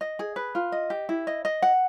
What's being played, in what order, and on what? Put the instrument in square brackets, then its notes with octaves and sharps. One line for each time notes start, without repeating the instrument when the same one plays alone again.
[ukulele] D#5
G#4
B4
F4
D#5
G4
E4
D#5
D#5
F#5